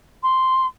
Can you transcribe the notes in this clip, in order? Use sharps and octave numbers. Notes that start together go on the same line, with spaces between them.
C6